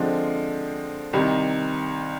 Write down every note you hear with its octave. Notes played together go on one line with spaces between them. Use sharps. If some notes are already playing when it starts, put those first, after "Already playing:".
Already playing: D3 F3 G#3 C4
C2 C3 D#3